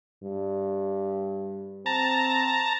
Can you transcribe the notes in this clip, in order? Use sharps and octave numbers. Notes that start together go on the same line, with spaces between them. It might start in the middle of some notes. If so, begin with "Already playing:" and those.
G2
C4 A5 A#5